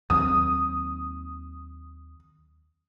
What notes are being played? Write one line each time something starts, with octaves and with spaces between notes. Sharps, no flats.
D#2 F#3 C4 D#6